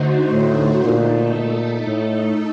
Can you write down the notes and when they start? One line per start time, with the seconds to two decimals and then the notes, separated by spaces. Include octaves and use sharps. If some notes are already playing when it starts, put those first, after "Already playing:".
Already playing: D3 A3 D#4 F#4 C5
0.33 A2
0.84 A#2 A3 D#4 A4
1.36 A#2
1.88 A2